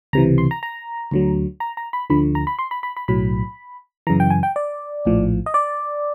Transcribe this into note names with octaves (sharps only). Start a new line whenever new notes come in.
C#2 C3 E3 A#5
C6
A#5
A#5
D2 D3 F#3
A#5
A#5
B5
D2 D3 F3 B5
A#5
B5
C6
B5
B5
B5
B1 A2 F#3 B5
F#2 C#3 E3 A#5
G5
G#5
G5
D5
A#1 A2 F3
D#5
D5